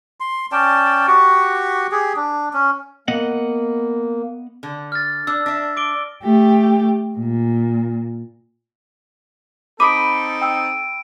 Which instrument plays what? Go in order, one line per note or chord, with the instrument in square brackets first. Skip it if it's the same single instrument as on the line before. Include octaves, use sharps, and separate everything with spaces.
[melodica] C6
C#4 D5 G5 A5
F#4 G4 C#6
G4 G#4
D4
C#4
[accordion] A#3 [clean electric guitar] B3 D#5 F#5
[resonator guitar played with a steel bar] D3
[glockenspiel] F6 A6
[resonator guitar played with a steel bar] D4 [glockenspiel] E6
[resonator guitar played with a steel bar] D4 E5 [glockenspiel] A#6
[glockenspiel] D6 D7 G7
[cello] A3 G4
A#2
[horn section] C4 D#4 A4 [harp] B5 D#6 [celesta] D6 [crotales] D7 D#7
[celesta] G5 E6